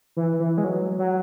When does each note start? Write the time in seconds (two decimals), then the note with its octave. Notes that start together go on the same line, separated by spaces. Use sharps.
0.17 E3
0.40 E3
0.58 G#3
0.64 F#3
0.99 F#3